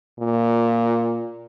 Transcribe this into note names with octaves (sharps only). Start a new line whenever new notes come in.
A#2